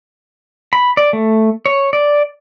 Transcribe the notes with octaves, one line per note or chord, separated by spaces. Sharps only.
B5
D5
A3
C#5
D5